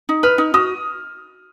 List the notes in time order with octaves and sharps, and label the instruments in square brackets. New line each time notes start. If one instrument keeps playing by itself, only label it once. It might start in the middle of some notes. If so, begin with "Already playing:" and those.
[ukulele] D#4
[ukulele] B4 [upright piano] F6
[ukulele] D#4
[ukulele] F#4 [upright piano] D#6